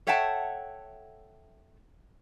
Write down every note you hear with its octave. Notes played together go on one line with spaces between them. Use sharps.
A4 C#5 E5 F#5 G5 A5